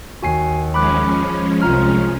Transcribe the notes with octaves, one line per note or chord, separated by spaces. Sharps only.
D#2 F#4 G#5 C7
F3 G#3 C#4 B5 D6 F#6
C2 F4 A#5 F6